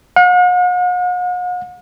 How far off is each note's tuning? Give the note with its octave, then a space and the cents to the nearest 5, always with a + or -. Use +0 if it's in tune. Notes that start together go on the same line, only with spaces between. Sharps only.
F#5 -45